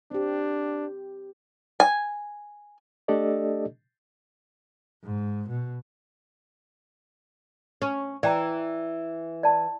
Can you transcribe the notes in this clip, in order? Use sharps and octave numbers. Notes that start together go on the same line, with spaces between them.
C4 D4 G4
G#5
A3 D4 G4 A4 D5 D#5
G#2
B2
C#4
E3 D5 G5 A#5
D5 A5